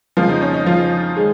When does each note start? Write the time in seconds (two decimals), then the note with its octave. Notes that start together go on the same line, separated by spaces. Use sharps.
0.17 F2 C#3 F3 A#3 F4
0.29 D#4
0.41 C#4
0.54 D#4
0.66 F3 F4
1.17 D#3 G#3 G#4